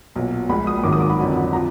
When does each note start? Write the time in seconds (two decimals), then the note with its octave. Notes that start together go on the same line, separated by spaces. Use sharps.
0.16 B1 A#2 F#3
0.49 A#1 A#2 G#3 B5
0.67 D#6
0.83 G#1 G#2 D#3 F#3 D6
0.93 D#6
1.00 D6
1.10 B5
1.19 F2 D3 F#3
1.53 F3 A#5